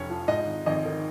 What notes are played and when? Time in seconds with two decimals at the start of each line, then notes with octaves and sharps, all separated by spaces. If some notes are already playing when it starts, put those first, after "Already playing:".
Already playing: F1 F2 C#4 C#5
0.10 F3
0.28 G#2 D#5
0.47 G#1
0.66 G#1 D#5
0.85 D#3